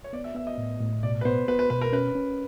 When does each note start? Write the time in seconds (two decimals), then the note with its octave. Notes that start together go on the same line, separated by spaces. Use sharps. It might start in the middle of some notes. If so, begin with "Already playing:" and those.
0.04 C#5
0.13 B3 D5
0.24 E5
0.35 B3 E5
0.47 D#5
0.58 A2
0.80 A2
1.03 B2 D5
1.21 B4
1.25 B3 C5
1.48 B3 B4
1.59 B4
1.70 B2 B4
1.81 A#4
1.93 C#4 B4
2.15 C#4